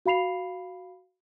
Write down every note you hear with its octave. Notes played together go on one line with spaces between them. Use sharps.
F#4 F5 B5 C7 F7